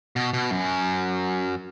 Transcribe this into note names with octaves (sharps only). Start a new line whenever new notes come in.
B2
B2
F#2